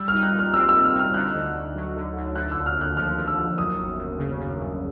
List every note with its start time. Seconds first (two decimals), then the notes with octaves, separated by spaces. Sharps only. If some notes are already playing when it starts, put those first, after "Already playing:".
Already playing: G3 E6
0.08 F6
0.14 D#4
0.23 F#6
0.34 A#2
0.39 F6
0.54 C4 E6
0.69 G3 E6
0.84 F6
0.94 D#4
0.99 F6
1.14 D3 F#6
1.35 D2
1.54 D2
1.76 F#3
1.96 D3
2.16 D2
2.35 D3 F#6
2.51 D#2 E6
2.66 F6
2.77 D#2 F#6
2.96 F3 F6
3.16 D3
3.27 E6
3.37 D#2
3.58 F#2 D#6
3.77 G1
3.98 G1
4.18 C#3
4.39 F#2
4.59 G1